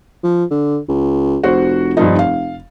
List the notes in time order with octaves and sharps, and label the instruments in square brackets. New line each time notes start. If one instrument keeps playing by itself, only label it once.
[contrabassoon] F3
D3
C#2
[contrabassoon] F1 [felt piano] F#4 C5
[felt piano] G2 F3 D#4
F5